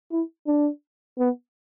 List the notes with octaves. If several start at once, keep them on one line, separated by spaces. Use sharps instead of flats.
E4
D4
B3